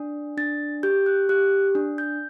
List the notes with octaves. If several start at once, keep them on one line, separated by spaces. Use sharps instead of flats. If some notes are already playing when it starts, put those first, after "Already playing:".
Already playing: D4
D4 A6
G4 G6
F#6
G4 F#6
D4
G6